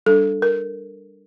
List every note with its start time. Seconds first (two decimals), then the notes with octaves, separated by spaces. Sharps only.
0.06 G3 D4 A4
0.42 A#4